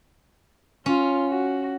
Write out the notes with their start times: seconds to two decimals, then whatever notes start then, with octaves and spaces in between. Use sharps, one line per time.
0.86 C#4 F4
1.29 F#4